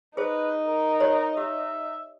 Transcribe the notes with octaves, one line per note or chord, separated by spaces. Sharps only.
D#4 G#4 B4 C5
A#4
G4 C5 C#5
G4 E5